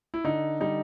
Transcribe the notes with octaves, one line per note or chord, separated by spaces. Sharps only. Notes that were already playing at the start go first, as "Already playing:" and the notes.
E4
D3 D#4
G3 D#4